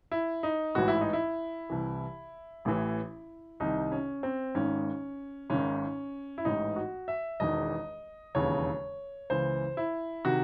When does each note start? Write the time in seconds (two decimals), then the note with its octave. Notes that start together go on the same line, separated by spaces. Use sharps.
0.12 E4
0.43 D#4
0.75 A1 G#2 E3 F#4
0.88 E4
1.01 D#4
1.13 E4
1.70 C2 C3 E3
2.65 A1 A2 E3
3.60 C2 C3 D#3 D#4
3.92 C#4
4.23 C4
4.55 G#1 G#2 D#3 C#4
5.50 G#1 G#2 D#3 C#4
6.38 E4
6.45 A1 G#2 E3 D#4
6.76 F#4
7.08 E5
7.40 E1 E2 D#3 D#5
8.35 E1 D#2 C#3 E3 C#5
9.30 C#2 C#3 E3 C5
9.77 E4
10.25 C3 D#3 F#4